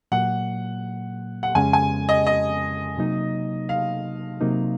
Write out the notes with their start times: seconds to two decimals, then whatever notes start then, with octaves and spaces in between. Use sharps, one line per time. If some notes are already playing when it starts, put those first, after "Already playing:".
0.12 A#2 F#3 A#3 F#5
1.43 F#5
1.55 F2 C#3 G#3 C#4 G#5
1.73 G#5
2.09 D#5
2.27 D#5
2.98 C3 F#3 A#3 D#4
3.69 F5
4.41 C3 F#3 A#3 D#4